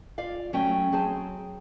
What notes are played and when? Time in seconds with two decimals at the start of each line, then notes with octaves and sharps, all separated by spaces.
0.18 F4 D5 F5
0.53 F#3 A3 C#4 G5
0.92 F#3 C4 G#4 G5 A5